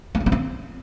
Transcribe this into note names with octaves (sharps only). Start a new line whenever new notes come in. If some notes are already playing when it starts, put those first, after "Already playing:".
A#3
C#4
B3
C4